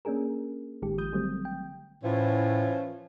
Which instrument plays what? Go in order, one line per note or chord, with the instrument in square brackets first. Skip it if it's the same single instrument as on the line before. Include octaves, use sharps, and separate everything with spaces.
[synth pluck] A#3 C#4 D4 G#4 A#4
A1 D#3 G#3 G4
F3 D#6 G6
D3 F#3 G3 A3 C4
G5
[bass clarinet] A2 [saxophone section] E3 F3 C#4